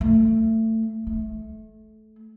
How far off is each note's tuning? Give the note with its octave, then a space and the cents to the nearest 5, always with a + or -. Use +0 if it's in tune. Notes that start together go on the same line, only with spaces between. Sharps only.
A3 +25
A3 -20